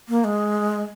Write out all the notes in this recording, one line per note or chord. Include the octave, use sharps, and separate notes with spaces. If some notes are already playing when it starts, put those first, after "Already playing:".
A#3
G#3